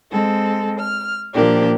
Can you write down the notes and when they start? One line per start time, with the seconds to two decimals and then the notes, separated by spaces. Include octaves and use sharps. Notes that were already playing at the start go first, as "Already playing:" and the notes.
0.11 G#3 C4 A4
0.79 F6
1.34 A#2 F3 A#3 D4 G4